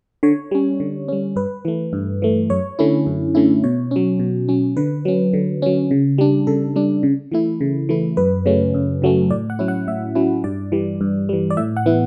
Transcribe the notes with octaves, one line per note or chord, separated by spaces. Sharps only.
D3 C#5
G3 C#4
D3
G3 C#4
G2 B4
E3 A3
G2
E3 A3
F#2 C#5
D3 A3 C#4 E4
F#2
D3 A3 C#4 E4
B2 C#5
F#3 C#4
B2
F#3 C#4
D3 B4
F#3 C#4
D3
F#3 C#4
C#3
G3 D4
C#3 A4
G3 D4
C#3
E3 A3 E4
C#3
E3 A3 E4
F#2 B4
C#3 F#3 A3 C#4
F#2
C#3 F#3 A3 C#4
A2 D5
F#5
F#3 C#4 E4
F#5
A2 E5
F#3 C#4 E4
G2 D5
E3 G3
G2
E3 G3
D5
A2 E5
F#5
E3 B3 E4